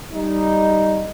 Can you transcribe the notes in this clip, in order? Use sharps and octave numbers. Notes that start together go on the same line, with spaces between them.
G3 D#4